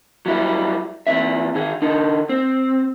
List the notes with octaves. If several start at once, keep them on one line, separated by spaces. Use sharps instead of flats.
F#3 G3 E4
E2 C4 E5
D#3 G#4
D3 D#4
C4